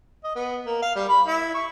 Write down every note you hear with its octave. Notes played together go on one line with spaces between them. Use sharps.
D#5
B3
A#3
F5
G3
B5
E4
C#6